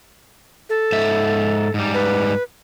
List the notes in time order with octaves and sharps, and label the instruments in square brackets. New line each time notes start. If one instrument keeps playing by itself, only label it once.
[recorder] A4
[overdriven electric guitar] G#2 E5
G#2 G3
[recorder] B4